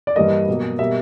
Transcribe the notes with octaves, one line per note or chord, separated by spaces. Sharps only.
D5
G2 E3 G3 A#3 D#5
B2 F#3 A#3
B2 G3 A#3 E5